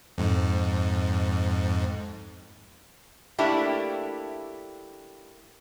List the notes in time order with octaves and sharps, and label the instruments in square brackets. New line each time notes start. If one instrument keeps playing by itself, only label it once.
[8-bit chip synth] F2 G#2
[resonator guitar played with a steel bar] A3 A#3 D4 E4 G4